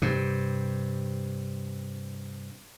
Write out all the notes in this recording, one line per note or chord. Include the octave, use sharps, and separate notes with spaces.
G2 C3